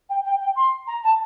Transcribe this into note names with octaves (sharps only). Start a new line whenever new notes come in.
G5
G5
G5
C6
A#5
A5